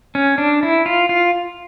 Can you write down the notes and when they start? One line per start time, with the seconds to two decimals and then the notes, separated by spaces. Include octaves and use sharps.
0.15 C#4
0.38 D4
0.63 E4
0.86 F4
1.09 F4